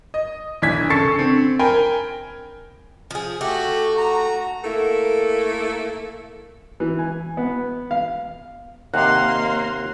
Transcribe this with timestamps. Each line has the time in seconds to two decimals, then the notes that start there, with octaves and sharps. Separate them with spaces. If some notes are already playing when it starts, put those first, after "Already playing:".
0.14 D#5
0.62 B1 E3 D4 G#6 B6
0.90 C#3 A4 C#6 A6 C7 C#7
1.19 D3 C4
1.59 A#4 G5 G#5 B5
3.11 F3 G#4
3.41 A3 F#4 G4
3.97 F#4 A#5
4.64 A3 A#3 E4 A4
6.80 E3
6.99 G#5
7.37 B3
7.91 F5
8.94 D#2 C3 A#3 F5 F#5 C6